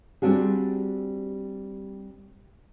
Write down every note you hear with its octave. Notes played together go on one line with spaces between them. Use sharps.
G3 C4 D4 F#4 G#4